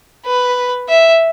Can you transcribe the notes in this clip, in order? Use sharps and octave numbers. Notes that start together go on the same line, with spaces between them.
B4
E5